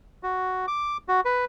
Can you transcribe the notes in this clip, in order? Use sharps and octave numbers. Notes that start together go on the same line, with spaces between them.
F#4
D6
F#4
B4